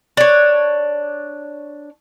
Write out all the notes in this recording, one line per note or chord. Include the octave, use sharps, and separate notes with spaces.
D4 C#5